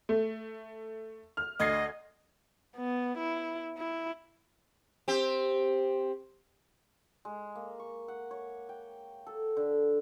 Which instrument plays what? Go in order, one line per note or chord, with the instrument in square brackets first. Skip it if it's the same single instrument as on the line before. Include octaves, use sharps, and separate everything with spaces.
[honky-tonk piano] A3
F6
[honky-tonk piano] D2 G#6 C7 [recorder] D#5
[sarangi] B3
E4
E4
[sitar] C4 G4
[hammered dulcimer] G#3
A#3
C#6
F#5
C#5
G5
A4
D3